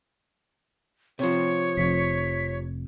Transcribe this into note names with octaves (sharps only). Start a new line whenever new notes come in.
C3 F3 C#5
F1 F2 B6